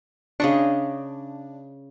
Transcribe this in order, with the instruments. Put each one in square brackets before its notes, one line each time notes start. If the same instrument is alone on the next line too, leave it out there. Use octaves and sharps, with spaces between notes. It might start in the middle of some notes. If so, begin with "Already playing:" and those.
[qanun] C#3 D#5 C#6 [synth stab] D4